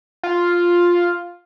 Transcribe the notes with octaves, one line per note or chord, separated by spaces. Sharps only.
F4